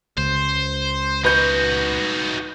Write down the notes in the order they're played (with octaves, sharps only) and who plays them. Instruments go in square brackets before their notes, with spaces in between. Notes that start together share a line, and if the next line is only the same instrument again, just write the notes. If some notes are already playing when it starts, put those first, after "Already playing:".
[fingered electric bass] C#2 [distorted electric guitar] C5
[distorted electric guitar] D#4 F#4 [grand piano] B4 G6